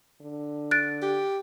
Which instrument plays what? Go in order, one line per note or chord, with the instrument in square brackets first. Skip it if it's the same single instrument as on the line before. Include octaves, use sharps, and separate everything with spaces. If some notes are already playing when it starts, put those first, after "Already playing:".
[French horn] D3
[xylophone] F#6 A6 D7
[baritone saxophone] G4